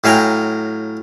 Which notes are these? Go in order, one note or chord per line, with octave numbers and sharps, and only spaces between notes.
A2 F#3 F5 G5 G#5 A#5